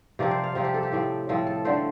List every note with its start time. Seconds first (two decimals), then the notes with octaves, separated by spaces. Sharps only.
0.19 C3 F3 C4 D5
0.31 C5
0.44 F5
0.55 C3 F3 C4
0.64 G4
0.74 A4
0.83 G4
0.92 A2 F3 C4
1.29 A2 F3 C4
1.47 A4
1.65 D3 F3 A3 C4 C5